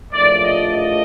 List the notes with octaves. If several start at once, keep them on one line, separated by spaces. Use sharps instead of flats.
A#1 A2 F3 A3 D5
D#5
D#5